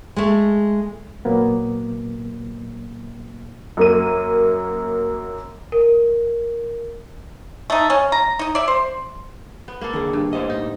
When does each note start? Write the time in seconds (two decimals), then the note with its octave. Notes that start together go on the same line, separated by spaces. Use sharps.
0.16 G#3 A3
1.25 A#2 F#3 A#3 B3
3.77 F#2 A#3 D#7
5.72 A#4
7.70 A3 D#4
7.90 C#4
8.12 A#5
8.39 D#4 D#5
8.55 D5 E5
8.68 C5
9.68 B3
9.81 A#3 A4
9.93 D3 D#3 G#4
10.13 G2
10.33 A2 C5 D#5
10.50 D#4